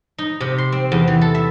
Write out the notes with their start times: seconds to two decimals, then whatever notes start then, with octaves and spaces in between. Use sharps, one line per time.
0.18 D#4
0.40 C3
0.58 C6
0.72 C4
0.92 E2
1.08 E3
1.21 A4
1.35 E5